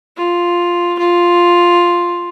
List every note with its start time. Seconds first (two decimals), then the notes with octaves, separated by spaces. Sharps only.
0.17 F4
0.99 F4